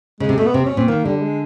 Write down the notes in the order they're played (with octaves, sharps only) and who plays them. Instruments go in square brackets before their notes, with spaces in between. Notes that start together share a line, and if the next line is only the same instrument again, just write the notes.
[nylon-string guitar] C#3 [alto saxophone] G#3
[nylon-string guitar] C3
[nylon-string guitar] B2 [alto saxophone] A3
[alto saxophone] B3
[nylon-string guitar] C3 [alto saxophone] C4
[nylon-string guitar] B2 [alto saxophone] C#4
[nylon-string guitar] A#2 [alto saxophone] C4
[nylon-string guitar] D#3 [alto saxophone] A#3
[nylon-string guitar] D3 [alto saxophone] G3
[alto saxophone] G3
G#3